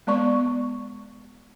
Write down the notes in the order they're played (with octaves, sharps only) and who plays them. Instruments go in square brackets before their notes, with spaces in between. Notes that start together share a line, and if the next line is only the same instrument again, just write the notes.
[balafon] G#3 B3 D5 C#6